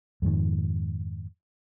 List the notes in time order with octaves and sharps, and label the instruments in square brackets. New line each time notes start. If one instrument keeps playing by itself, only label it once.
[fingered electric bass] F2 G#2 D#3